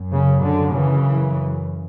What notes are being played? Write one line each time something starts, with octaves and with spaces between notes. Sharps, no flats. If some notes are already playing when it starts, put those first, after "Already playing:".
Already playing: F#2
C#3
D3
C#3 E3